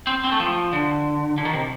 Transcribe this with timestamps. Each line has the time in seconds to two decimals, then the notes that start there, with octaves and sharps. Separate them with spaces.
0.07 C4
0.24 C4
0.32 A3
0.40 F3
0.73 D3
1.38 D3
1.45 D#3
1.53 C3